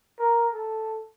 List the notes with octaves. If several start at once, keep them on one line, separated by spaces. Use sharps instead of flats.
A#4
A4